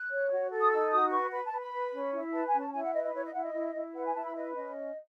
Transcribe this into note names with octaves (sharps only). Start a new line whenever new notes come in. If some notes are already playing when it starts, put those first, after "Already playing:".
Already playing: F#6
C#5
F#4
A4
D#6
D#4 E6
F#4 D#6
B4 C#6
B4 B5
A5
B4
B5
B4
C#4
E4
B4 A5
G#5
C#4
A5
E4 G#5
F#5
B4 D#5
D#5
E4 C#5
D#5
E4 F#5
D#5
E4
E4
B4 F#5
G#5
E4 A5
B5
B4 D#5
C#4 D#5